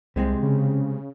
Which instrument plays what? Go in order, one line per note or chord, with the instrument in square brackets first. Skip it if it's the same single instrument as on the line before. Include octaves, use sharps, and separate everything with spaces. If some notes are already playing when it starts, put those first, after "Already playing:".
[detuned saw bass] C2 [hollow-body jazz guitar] C3 G#3 C4
[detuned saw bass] C#3